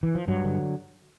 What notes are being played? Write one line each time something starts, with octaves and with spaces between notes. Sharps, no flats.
E3
F3
G2 F#3
D3